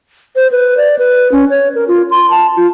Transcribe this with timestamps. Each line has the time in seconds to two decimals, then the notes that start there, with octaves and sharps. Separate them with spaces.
0.36 C5
0.52 B4
0.77 D5
0.99 B4
1.32 C#4
1.50 C#5
1.75 A#4
1.88 F4
2.11 C6
2.30 A5
2.57 F4